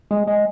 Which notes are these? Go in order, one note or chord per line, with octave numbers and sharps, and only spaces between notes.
G#3
G#3